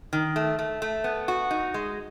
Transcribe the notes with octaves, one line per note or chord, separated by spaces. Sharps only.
D#3
A3
A3
A3
B3
F#4
D#4
G#3